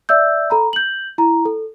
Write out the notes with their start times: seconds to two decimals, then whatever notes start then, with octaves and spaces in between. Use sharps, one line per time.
0.09 D5 E5 E6 G6
0.50 A4 A#5 B5
0.73 G6 F#7
1.18 E4 A#5
1.45 A4